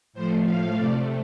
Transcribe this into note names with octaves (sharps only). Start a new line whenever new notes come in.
A2 F3 A3 C5
F5
C3 A3 D5